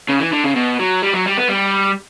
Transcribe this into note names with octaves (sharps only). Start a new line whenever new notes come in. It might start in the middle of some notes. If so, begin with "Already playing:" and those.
C#3
E3
D3
C#3
B2
F#3
G3
F#3
G3
B3
G3